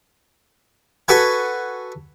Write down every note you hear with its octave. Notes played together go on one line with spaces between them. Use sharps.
F#4 A4 B4 F#5 G#5